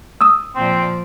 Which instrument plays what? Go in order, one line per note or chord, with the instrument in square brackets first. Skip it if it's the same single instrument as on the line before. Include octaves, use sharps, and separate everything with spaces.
[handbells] D#6 E6
[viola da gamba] A#2 F3 D5 [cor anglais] C4